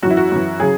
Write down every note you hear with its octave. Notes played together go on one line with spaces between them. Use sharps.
F#2 E3 E4 F#4
F#4
F#2 E3
C#3 F#3 G#4